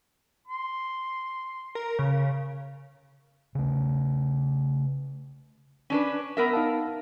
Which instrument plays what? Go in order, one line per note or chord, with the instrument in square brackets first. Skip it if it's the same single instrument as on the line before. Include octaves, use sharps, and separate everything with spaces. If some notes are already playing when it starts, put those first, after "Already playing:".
[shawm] C6
[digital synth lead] A#4
C#3
[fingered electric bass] C#3 A3
[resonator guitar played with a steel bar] C#4 D4 B4
B3 A#4 E5
[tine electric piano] D#4 F5 A5